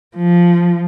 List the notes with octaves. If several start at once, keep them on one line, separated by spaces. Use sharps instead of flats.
F3